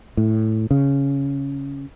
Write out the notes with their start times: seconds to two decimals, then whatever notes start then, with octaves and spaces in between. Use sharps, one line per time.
0.17 A2
0.71 C#3